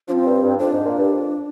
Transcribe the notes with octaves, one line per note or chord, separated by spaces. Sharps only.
F3 C4 D4
G2
G2
F2 D4
G#2
A#2
G2
F2